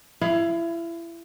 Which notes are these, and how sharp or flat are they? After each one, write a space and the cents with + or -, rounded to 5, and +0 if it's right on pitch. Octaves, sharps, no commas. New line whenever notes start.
E4 +30 F5 +10